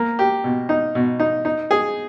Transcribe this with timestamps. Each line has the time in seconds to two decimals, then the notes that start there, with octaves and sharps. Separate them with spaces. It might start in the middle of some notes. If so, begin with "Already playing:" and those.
Already playing: A#3
0.19 G4
0.44 B2
0.69 D#4
0.95 B2
1.20 D#4
1.45 D#4
1.71 G#4